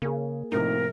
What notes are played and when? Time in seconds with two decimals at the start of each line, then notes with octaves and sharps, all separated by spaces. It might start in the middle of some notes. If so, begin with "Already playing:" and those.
0.02 C#3 A#3 G#4
0.52 A2 C3 F3 D#4 A#4